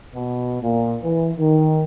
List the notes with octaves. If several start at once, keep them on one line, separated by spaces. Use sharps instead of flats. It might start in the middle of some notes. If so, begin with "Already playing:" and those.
B2
A#2
E3
D#3